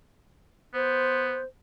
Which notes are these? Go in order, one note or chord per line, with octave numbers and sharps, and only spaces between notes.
B3 C5